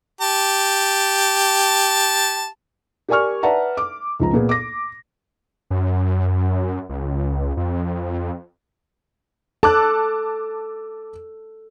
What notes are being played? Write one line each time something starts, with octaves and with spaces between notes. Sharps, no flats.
G4 A5
G4 A#4 D5 G#5 C#6 F6
B4 D5 E5 F#5 A5 A#5
D6
C#2 F3 A#5
A#2 B3 G#4
D6 A#6
F#2
C#2
F2
A4 A5 D6 F#6